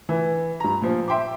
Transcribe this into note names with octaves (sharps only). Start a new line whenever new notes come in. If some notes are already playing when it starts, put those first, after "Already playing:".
E3
G2 A#5
A#2 F3
E5 G5 C6 D6